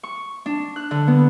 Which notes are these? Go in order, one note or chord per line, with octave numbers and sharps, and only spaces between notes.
C#6
D4
F#6
D3
B3